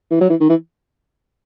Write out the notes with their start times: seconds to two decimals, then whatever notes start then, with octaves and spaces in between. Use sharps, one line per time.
0.11 E3
0.21 F#3
0.30 E3
0.40 D#3
0.49 E3